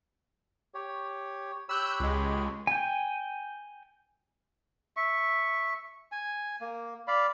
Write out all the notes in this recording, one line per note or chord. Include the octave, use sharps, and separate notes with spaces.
G4 C#5
G4 C#5 B5 E6 F#6 G6
C#2 G#3
G5 G#5
E5 C#6
G#5
A#3
D5 F5 B5